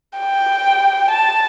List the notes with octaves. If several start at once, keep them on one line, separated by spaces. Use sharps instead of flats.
G5
A5